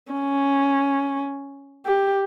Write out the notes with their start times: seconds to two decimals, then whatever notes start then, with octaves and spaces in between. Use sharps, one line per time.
0.12 C#4
1.86 G4